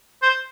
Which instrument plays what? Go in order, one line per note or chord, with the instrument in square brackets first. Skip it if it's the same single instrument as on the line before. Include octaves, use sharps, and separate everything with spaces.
[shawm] C5